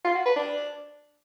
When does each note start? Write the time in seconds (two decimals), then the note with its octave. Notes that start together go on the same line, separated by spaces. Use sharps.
0.05 F4
0.15 F#4
0.26 B4
0.36 D4